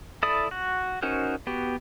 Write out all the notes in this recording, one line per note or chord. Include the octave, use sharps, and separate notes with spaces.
E4 A4 D5 B5 D#6
F#4
C#4 D#4 F#4 A#4 C5
B3 F#4 G4